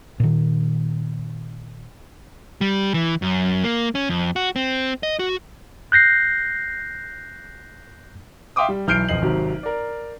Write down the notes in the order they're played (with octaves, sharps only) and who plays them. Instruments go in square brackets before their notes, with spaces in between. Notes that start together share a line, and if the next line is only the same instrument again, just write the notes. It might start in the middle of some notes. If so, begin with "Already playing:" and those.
[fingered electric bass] A#2 D#3
[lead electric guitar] G3
E3
F#2
A#3
C#4
F2
F#4
C4
D#5
F#4
[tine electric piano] F#6 G6 A#6 C7
[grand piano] E5 F5 G5 C6 D6 D#6
G3
B1 E3 F6 G6 C7 D7
E1 F2 D#5 C7 F#7
G#1 C3 F#3
A#4 D5